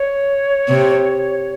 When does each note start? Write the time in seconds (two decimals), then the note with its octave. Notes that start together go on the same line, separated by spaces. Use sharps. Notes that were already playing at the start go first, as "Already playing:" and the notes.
Already playing: C#5
0.68 C3